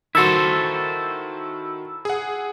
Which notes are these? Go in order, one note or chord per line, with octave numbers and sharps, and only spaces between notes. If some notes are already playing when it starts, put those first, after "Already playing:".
D#3 E4 F#4 A4 C5 E6
G#4 F#5